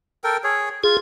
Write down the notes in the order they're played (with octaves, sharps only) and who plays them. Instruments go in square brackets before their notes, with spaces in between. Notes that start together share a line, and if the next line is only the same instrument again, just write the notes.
[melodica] A4 A#4 G5
G#4 C#5
[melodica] F4 [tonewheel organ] G#4